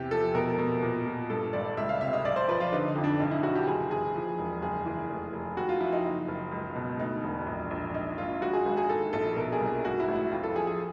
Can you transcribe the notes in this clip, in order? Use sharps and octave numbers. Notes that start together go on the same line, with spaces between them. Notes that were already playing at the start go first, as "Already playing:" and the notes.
Already playing: E2 C3 G4
F3 A4
B2 A#4
B2
A#2
A#2
G2 A4
G#1 D5
C#2 E5
F5
C3 E5
D#5
B1 D5
C5
F3 B4
F4
D3 D#4
D#4
F2
D4
B1 D#4
E4
B1 F#4
G4
F#1 G#4
E3 G#4
F3
E1
F#1 G#4
E3
F1
F1
D#2 F#4
F4
F3 E4
D#4
F#1
F#1
C#2
B2
D2 D#4
E1
A#1
A#1
G#2 D#4
G#1 F4
G#1 F#4
G#4
G#1
G#4
D#3 A4
A#1 A4
B2 A#4
G#4
C2
G#2 F#4
E4
A1
E4
F2 F4
A4
F3 G#4
G#4